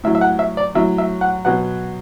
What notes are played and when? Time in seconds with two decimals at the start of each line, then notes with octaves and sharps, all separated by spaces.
0.04 A2 F#3 E5
0.15 E5
0.21 F#5
0.39 E5
0.57 D5
0.75 A2 F#3 E5
0.98 E5
1.21 F#5
1.45 B2 F#3 F#5